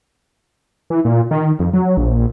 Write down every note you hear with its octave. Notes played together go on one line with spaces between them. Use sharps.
E3
A#2
D#3
F2
F#3
A#1